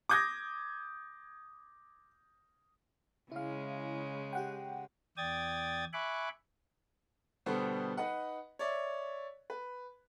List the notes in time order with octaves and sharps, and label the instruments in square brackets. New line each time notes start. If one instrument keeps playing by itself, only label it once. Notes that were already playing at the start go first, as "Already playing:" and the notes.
[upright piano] D6 D#6 G6 G#6 A#6
[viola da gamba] C#3 G#3 [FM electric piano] E4 F5
[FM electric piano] G4 F#5 G5
[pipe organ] E2 D5 G5 D#6 G#6 A6
E5 G#5 B5 C#6 D6 F#6
[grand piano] B2 D3 G3 B3 A4 C5
D#4 B4 D#5 F#5
C#5 D5 E5
B4